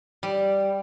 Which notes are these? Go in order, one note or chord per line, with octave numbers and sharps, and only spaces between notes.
G3